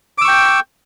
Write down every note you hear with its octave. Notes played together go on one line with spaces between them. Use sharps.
G5 C#6 D6 E6